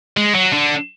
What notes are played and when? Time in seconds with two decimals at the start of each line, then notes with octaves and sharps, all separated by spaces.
0.17 G#3
0.35 F#3
0.53 D3